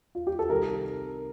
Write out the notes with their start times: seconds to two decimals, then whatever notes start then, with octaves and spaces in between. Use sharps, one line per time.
0.15 F4
0.27 G4
0.39 A4
0.49 C2 C3 D#3 G3 A#4